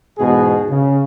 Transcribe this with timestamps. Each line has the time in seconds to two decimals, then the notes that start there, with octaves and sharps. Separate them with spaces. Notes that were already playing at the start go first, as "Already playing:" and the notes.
0.19 E2 G#2 B2 G#4
0.70 C#3